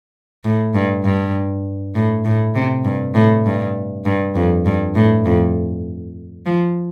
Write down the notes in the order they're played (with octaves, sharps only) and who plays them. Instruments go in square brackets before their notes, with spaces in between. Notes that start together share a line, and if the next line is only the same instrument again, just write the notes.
[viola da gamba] A2
G2
G2
A2
A2
C3
G2
A2
G2
G2
F2
G2
A2
F2
F3